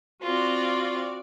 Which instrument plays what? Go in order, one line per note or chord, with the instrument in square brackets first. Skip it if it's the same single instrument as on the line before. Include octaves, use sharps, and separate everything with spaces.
[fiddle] C4 F4 [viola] F#4 D5